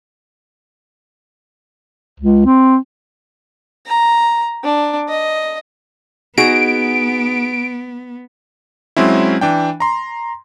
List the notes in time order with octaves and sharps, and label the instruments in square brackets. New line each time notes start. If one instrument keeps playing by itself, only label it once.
[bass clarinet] C#2
C4
[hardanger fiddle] A#5
D4
D#5
[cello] B3 [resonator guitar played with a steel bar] D#4 F#4 G#4 [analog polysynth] D7
[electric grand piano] F#3 G#3 C4 C#4 E4
E3 D4 G5
A#5 C6